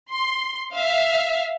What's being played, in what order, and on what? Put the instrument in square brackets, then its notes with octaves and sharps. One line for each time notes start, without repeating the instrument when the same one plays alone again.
[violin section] C6
E5 F5